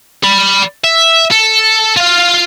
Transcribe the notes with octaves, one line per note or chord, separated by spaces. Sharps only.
D5 B5
E5
A4
F4 F5